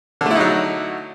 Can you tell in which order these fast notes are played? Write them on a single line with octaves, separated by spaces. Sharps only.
D3 A3 E4 D#4 F#3